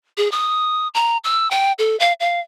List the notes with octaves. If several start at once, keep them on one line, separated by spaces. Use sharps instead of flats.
G#4
D#6
A#5
E6
G5
A4
F5
F5